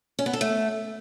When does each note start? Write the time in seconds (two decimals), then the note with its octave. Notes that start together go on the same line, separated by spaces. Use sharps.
0.19 C#4
0.26 B3
0.33 A4
0.41 A3